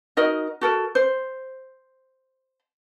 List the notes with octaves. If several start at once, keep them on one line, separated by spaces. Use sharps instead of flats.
D#4 F#4 A#4 D#5
F#4 A4 A#4
C5